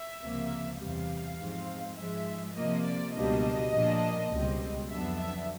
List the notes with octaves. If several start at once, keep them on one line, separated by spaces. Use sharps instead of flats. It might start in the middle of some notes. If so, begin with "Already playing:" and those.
Already playing: E5
C#2 C3 F3 A#3
E2 C3 E3 G3 F5
G#2 F3 G#3 C4
G#2 F3 G#3 E5
C3 F3 A#3 D#5
D5
C#2 B2 G3 A#3 D4 D#5
A#2 F3 A#3 D4
C#2 B2 G3 C4
F2 D3 F#3 B3 D4 E5
E5